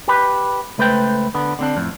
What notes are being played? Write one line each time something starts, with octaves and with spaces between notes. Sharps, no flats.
G4 B4
C#2 A3 B4 C5 G5
D3 B3
D3 C4 D4
F2 A2